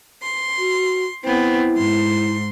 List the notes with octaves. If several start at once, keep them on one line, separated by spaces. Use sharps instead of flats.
C6
F#4
B3 C4 E4
G#2 C6